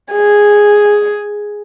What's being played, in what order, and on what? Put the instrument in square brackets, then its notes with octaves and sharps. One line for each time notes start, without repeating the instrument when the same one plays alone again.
[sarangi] G#4